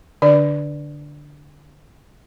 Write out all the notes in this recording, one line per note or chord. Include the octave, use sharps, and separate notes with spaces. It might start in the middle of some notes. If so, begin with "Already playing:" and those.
D3 D4 D5